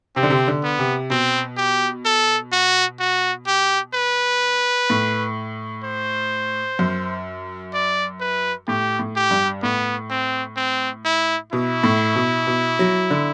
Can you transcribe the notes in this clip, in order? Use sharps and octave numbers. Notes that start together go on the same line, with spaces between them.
C3 C4
D3
C3
D3
B3
C3
B2 C4
G4
A4
F#4
F#4
G4
B4
A2
C5
F#2
D5
B4
A2 G4
A2
G4
G2
A2 B3
C4
C4
E4
B2 E4
A2
B2
B2
F#3
D3